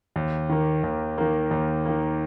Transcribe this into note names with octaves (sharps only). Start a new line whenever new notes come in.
D#2
D#3 A#3
D#2
D#3 A#3
D#2
D#3 A#3